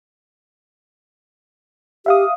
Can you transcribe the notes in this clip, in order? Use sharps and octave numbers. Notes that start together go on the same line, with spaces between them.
G4 E5 F5 D#6